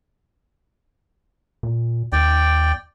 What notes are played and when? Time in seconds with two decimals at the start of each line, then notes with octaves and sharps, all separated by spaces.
1.63 A#2
2.12 D#2 D5 G5